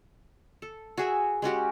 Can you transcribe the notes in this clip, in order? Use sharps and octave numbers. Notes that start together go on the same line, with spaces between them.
A4
F#4 G#4 E5
G#3 C#4 F#4 G4